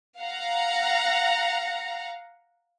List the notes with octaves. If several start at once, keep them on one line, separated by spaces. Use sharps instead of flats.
F5 F#5 A#5